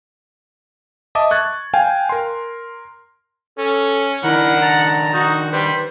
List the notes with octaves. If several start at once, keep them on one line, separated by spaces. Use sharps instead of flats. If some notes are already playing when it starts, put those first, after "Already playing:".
D#5 E5 A5 D6 D#6
C#6 F#6 G#6 A6
F5 G5 G#5
A#4 C6
C#4 A4
D#3 D4 E4 A#4 F#5
A5 A#5
D#4 F#4
G3 B4 C5